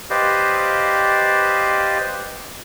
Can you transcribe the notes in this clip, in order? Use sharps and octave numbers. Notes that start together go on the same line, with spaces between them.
G4 B4 C5 D5 D#5 F5